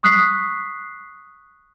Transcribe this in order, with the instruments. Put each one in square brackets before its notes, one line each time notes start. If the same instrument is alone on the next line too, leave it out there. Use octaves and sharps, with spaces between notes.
[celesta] C#6 D#6 F#6 B6 C7